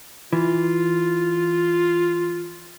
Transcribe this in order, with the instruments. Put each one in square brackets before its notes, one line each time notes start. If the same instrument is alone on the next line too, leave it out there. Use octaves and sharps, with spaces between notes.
[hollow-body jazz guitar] E3 [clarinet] F4